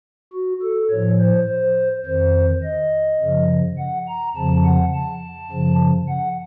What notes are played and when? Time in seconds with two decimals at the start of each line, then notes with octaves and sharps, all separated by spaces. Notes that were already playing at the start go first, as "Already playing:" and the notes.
0.33 F#4
0.62 A4
0.90 A2 F3 C#5
1.20 C5
1.48 C5
2.06 F2 D#3 C5
2.64 D#5
3.21 F#2 C#3 F3
3.78 F#5
4.08 A#5
4.36 F2 C#3 F3 A5
4.65 F#5
4.94 A5
5.51 F#2 C#3 F3
6.09 F#5